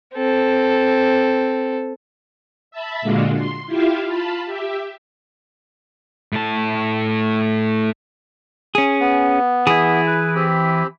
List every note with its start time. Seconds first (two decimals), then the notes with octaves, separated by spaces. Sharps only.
0.15 C4 A4
2.71 E5 A5 B5
3.02 A#2 D3 G#3 D4 F4 F#4
3.35 C6
3.67 E4 F4 G4 E5 F5
4.06 F4 A5 B5
4.46 G4 E5
6.33 A2 A5
8.75 C#4 G#4
9.00 B3
9.67 E3 E4 G#4
10.07 B4
10.35 C4 G4 B5